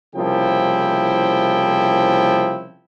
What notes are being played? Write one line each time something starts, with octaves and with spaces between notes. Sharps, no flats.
C2 C#3 F3 A#3 E4 G5